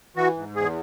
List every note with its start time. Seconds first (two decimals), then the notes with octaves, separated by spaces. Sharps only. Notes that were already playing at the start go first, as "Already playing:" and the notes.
0.16 E3 F#4
0.37 G#2
0.56 E2 G#4